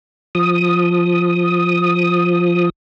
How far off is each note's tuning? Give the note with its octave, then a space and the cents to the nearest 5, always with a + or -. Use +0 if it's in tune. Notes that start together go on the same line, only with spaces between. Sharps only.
F3 +0 D#6 +0